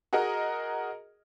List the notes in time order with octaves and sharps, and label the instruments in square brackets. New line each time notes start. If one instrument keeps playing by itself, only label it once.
[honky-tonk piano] F#4 G#4 A#4 D#5